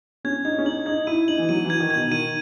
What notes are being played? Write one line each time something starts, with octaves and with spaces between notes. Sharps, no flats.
C#4 G#6
D#4 G#6
C#4
D#4 F#7
D#4 G#6
E4 D#7
D#4 F#7
E3
F#3 D#7
E3
G#6
D#3
B2 G#6
D#3 D#7